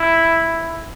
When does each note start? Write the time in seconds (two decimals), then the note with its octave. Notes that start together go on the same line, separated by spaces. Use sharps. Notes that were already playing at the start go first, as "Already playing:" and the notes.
Already playing: E4